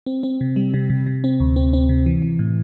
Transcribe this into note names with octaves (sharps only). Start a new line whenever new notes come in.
C4
C4
C3
G3
C3
C3
C3
C4
D2
C4
C4
C3
E3
E3
A2